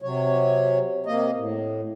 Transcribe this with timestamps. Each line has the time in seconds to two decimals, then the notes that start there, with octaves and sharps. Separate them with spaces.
0.02 C3 F#3 C#5
1.06 C3 A#3 D#5
1.36 A2